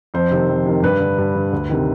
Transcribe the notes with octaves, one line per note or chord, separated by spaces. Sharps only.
F2 C5
C3 D#3
F2
C3 D#3
G2 B4
D3
G2
D3
D2
C3 D#3